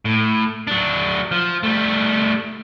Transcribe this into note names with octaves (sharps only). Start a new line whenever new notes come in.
A2
F#3 D4
F3
G3 A3